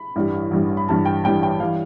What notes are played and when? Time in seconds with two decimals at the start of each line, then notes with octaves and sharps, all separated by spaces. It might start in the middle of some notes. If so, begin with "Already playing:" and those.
Already playing: B5
0.16 A1 G2 E3 G3
0.51 A1 G2 E3 G3
0.77 B5
0.88 A1 G2 E3 G3 A5
1.06 G5
1.24 A1 G2 E3 G3 G5
1.43 G5
1.60 E3 G3 F5